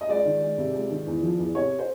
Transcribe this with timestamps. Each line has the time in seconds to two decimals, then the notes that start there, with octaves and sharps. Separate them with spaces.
0.01 D#5
0.09 C#2 D5
0.25 D#3
0.41 G#3
0.58 C3
0.74 C#2
0.90 D#3
1.06 E2
1.22 F3
1.38 E2
1.55 C3 C#5
1.79 C5